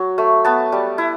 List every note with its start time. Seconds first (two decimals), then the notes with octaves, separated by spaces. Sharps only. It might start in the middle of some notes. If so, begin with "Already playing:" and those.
Already playing: F#3
0.18 A3
0.45 B3 A5
0.72 G3
0.98 E4